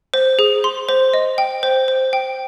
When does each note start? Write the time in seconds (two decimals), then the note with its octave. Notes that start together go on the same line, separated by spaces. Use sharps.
0.14 C5
0.39 G#4
0.64 C6
0.89 C5
1.14 D#5
1.38 G5
1.63 C5
1.88 C5
2.13 G5